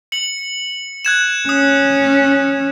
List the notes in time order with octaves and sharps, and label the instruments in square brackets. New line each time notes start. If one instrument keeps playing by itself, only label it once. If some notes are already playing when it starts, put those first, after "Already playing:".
[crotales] C#7 F#7
F#6 G#6 E7
[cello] C#4 [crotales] D#6